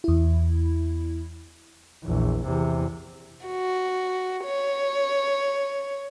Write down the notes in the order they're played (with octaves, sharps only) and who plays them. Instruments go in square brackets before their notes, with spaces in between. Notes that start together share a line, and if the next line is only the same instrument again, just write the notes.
[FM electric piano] E2 E4
[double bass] A#1 E2
E2 C3
[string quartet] F#4
C#5